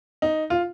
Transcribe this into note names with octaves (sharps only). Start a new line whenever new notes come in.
D#4
F4